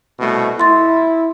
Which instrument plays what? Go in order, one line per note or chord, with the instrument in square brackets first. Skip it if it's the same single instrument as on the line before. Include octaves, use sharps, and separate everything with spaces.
[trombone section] C2 B2 A3
[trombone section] E4 [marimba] C6 A6